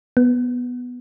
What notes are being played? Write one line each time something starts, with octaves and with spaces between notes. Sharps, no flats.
B3